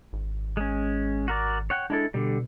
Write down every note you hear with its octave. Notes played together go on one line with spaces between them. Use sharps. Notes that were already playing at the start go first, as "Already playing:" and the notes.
G#1
G#3 C#4
F#4 A#4 D5
C#5 F#5 G5
G#3 D4 E4 A4
B2 D3 G3